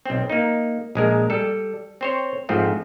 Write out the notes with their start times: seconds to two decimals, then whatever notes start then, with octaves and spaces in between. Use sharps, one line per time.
0.06 B1 C4
0.30 A#3 D#4
0.95 A#1 G#3 A#4
1.30 G3 A4
2.01 C4 C5 C#5
2.49 G#2 F3 A3 C4